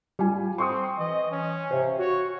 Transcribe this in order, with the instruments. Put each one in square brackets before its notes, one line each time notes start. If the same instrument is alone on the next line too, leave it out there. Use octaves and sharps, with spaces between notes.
[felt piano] G3 F4 G#5
[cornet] C4 [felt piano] C6 C#6 D#6
[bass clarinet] E3 [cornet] D#5
[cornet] C#4
[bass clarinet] C3 [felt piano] C5 F5
[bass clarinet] F#4 [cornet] C#5